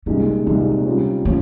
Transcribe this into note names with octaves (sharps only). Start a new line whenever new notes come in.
C2 A#2 G#3 C#4 D#4
C2 A#2 G#3 C4 D#4
C3 G3 C#4 F4
A#3 C#4 F4